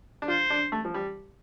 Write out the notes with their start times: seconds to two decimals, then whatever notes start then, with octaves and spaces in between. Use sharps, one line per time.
0.22 D4
0.28 F4 C5
0.50 D4
0.72 A3
0.85 F3
0.94 G3